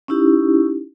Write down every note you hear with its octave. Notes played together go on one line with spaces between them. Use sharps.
C#4 D#4 E4 G4